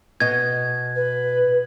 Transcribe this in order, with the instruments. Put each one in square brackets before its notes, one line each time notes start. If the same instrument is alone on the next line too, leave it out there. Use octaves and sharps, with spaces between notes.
[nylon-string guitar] B2 D#5 [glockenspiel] G#6
[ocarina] B4